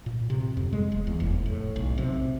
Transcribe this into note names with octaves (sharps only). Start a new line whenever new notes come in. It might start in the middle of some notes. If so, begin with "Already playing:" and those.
A#2
C3
F2
G#3
E1
E2
F1
A2
B1
C3